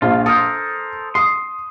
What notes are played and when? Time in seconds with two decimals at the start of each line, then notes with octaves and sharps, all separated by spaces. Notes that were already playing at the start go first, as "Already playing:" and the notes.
0.02 A#1 F4
0.26 A4 A#4 C5 D#6
1.15 C6 D#6